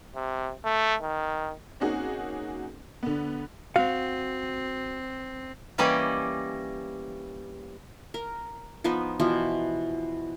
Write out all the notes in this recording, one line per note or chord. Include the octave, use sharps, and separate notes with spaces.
C3
A3
D#3
A#3 C4 C#4 D#4 F#4 G#4
D3 B3
C4 F#4 F5
E3 G3 A#3 C#4 D5 D#5
A#4
F3 B3 D#4 B4
B2 E3 F3 E4